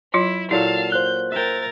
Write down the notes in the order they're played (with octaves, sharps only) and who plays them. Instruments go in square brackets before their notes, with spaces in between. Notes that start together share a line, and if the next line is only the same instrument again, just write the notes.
[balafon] F#3 F4 C#5 [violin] E4
[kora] A#2 F#3 A4 [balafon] E4 [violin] F5 A5
[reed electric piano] C5 F#6 [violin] G6
[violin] A#4 A6 [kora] E5 G5